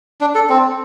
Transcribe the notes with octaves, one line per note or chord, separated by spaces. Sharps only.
D4
A4
C4